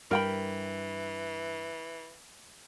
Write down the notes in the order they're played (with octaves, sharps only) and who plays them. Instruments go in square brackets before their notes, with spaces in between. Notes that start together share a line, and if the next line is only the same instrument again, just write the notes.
[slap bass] G2 G3 [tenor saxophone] E3 [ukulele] A#4 G5 B5